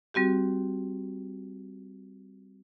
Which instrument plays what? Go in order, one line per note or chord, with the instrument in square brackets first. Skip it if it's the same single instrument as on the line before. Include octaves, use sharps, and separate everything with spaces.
[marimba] G3 C4 F#4 G4